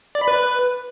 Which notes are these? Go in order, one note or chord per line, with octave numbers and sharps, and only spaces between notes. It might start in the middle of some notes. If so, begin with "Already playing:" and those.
D5
B5
B4